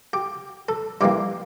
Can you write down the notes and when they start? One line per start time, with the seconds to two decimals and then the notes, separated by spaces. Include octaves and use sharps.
0.13 G4
0.69 A4
1.01 G2 E3 G3 A#3 G4